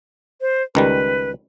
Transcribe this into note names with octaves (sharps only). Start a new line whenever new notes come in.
C5
C#2 D#3 G3 B4